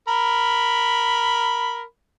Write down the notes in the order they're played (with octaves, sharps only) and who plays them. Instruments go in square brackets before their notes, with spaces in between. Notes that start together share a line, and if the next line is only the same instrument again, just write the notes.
[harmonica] A#4 B5